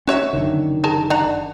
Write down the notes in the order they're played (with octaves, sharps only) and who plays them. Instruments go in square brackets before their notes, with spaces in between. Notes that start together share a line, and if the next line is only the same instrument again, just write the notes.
[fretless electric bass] C#4 [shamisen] F#4 C#5 E5
[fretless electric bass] F#1 D3 D#3
[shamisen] G#4 A#4 A5
D4 F#5 A#5